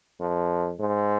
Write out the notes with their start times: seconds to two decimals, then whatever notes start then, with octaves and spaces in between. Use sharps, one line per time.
0.20 F2
0.80 G#2